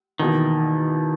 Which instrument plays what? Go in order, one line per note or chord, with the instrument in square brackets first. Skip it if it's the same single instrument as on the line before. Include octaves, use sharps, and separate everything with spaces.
[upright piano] E2 B2 A#3 [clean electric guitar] D#3